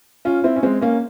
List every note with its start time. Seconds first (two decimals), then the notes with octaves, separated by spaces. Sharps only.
0.25 C#4 F4
0.44 C4 E4
0.56 C#4
0.63 G#3 C4
0.81 A#3 C#4